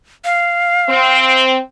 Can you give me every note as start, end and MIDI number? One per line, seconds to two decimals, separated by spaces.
0.25 1.43 77
0.89 1.59 60